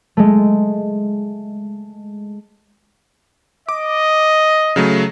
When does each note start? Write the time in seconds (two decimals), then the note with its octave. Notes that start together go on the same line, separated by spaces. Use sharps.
0.17 G#3 A3
3.69 D#5 D6
4.76 C#3 F#3 A3